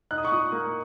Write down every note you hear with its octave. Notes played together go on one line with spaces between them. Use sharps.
D#4 F#6
D#6
C#6
A#2 D#6
A#3